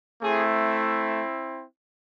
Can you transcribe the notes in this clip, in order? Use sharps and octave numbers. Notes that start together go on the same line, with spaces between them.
A3 C4 E4 G#4